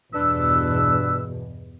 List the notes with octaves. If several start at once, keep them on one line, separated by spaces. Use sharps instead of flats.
E2 G2 B2 D4 B4 E6